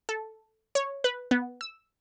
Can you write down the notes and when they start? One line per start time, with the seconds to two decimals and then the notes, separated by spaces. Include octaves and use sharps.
0.09 A4
0.75 C#5
1.04 B4
1.31 B3
1.61 E6